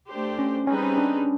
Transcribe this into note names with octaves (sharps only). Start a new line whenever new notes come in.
A3 D4 G4 C5
C#4
G3 C4 C#4 D#4 G#4 B4
C#4
D4